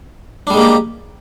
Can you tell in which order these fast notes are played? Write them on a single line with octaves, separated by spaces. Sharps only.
D4 G3 G#3 A#3 G4